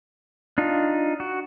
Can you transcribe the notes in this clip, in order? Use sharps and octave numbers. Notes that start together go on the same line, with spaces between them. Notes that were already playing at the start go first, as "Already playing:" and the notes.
D4 D#4 F4
F#4